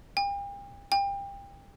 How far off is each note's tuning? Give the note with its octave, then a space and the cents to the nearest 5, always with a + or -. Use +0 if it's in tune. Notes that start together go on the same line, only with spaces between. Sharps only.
G5 +40
G5 +30